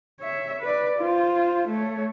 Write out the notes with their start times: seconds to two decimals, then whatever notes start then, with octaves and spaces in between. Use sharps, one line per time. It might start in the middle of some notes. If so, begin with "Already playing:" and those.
0.20 C#5 E5
0.62 B4 D5
0.99 F4 C5
1.68 A3 C#5